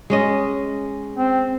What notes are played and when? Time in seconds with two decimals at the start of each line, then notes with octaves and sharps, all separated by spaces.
0.10 G#3 C#4 D#5
1.16 C4